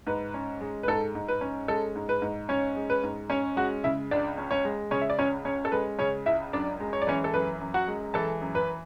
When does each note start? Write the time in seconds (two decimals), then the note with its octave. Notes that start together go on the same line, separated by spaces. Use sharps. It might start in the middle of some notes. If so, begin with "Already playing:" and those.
0.07 G#2 B4
0.34 C#4
0.61 G#3
0.83 B4
0.88 G#2 A4
1.15 G#2
1.28 B4
1.41 C#4
1.68 G#3 A4
1.96 G#2
2.09 B4
2.22 G#2
2.49 C#4 C#5
2.76 G#3
2.90 B4
3.04 G#2
3.30 C#4 C#5
3.56 G#3 F#4 F#5
3.84 C#3 E4 E5
4.11 C#2 D4 D5
4.38 C#4
4.51 C#4 C#5
4.65 G#3
4.91 C#3 C#4 C#5
5.01 E5
5.10 D5
5.19 C#2 C#4 C#5
5.45 C#4 C#5
5.65 A4
5.72 G#3 B4
5.99 C#3 C#4 C#5
6.26 C#2 E4 E5
6.53 F#2 D4 D5
6.80 G#3
6.93 C#5
7.02 D5
7.07 E3 C#4 C#5
7.24 A4
7.34 F#2 B4
7.61 F#2
7.74 F#4 F#5
7.88 G#3
8.14 E3 A4 A5
8.41 F#2
8.55 B4 B5